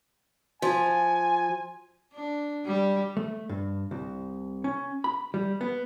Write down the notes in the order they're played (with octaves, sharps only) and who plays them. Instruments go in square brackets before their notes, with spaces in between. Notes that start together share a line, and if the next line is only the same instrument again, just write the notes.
[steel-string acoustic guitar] F3 [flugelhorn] G#5
[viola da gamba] D4
G3
[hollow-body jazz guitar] A3
G2
C2
C#4
B5
G3
B3